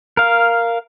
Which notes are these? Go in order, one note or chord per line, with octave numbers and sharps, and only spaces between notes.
A#4 F5